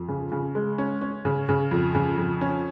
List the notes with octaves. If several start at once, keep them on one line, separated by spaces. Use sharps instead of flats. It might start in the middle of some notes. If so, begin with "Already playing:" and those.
Already playing: F2
C#3
C#3
G#3
C#4
C#4
C#3
C#3
F2
C#3
F2
C#4